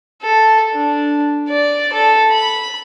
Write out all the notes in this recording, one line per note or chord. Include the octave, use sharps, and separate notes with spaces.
A4
D4
D5
A4
B5